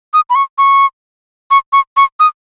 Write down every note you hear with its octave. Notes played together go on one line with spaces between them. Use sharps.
D#6
B5
C#6
C#6
C#6
C#6
C#6
D#6